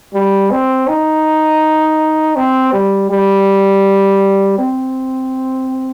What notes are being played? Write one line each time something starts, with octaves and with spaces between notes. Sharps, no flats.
G3
C4
D#4
C4
G3
G3
C4